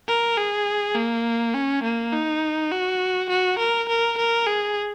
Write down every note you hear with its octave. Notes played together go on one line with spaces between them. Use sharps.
A#4
G#4
A#3
C#4
A#3
D#4
F#4
F#4
A#4
A#4
A#4
G#4